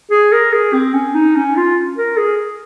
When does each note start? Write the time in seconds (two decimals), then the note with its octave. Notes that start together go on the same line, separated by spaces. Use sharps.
0.11 G#4
0.32 A#4
0.53 G#4
0.73 C4
0.94 C#4
1.15 D#4
1.36 C#4
1.56 F4
1.97 A#4
2.18 G#4